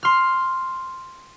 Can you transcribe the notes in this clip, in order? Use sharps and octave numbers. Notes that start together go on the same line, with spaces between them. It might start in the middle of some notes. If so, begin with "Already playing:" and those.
C6 F6